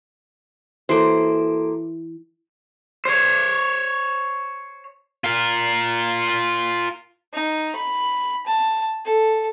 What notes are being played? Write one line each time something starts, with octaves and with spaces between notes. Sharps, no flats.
E3 A#3 F#4 A4 C5 D7
C5 C#5
F4 A#4
D#4
B5
A5
A4